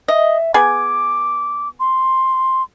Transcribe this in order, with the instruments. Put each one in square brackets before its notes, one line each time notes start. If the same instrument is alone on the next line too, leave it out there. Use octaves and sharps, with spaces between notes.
[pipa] D#5 [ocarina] E5
[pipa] B3 G#4 G#5 [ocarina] D6
[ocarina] C6